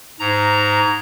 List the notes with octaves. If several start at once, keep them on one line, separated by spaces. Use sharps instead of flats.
G#2 A#5